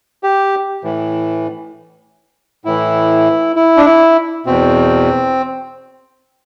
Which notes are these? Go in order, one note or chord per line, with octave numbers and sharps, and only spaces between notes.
G4
A2 E3
A2 E3 E4
E4
D4
E4
E2 B2 C4